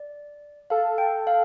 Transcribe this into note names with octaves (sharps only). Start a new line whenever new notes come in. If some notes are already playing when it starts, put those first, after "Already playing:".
Already playing: D5
A4 F5
G5
F5